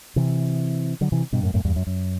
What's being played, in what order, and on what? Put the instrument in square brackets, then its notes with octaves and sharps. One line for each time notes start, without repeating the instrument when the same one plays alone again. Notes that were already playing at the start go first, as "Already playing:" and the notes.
[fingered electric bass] C3 E3
D3 F#3
C3 E3
G2 B2
F#2 A2
F#2 A2
E2 G2
F#2
F#2